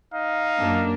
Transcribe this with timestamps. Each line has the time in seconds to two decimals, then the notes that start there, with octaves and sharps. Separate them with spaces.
0.14 D#4 F5
0.59 F#2 A#3 D4